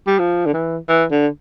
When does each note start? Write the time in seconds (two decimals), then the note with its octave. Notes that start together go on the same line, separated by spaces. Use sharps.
0.07 G3
0.19 F3
0.46 D3
0.53 E3
0.88 E3
1.11 D3